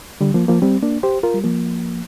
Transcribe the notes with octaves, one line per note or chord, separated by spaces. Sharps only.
D3 G3
F3 A#3
F3 A#3
G3 C4
A#3 D4
G4 C5
F4 A#4
G3
F3 A#3